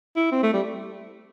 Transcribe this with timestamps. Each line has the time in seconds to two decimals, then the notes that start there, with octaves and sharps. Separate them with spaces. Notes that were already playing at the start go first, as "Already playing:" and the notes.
0.16 E4
0.32 C4
0.43 A3
0.53 G3